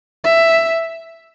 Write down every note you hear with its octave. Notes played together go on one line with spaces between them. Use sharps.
E5